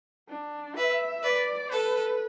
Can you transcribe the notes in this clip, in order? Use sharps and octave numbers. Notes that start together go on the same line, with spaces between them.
D4
B4 E5
B4 D5
A4 B4